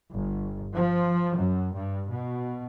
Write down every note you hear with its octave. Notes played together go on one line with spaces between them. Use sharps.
G1
F3
F#2
G2
B2